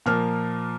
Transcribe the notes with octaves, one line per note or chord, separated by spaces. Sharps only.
A#2 F3 A#3 F6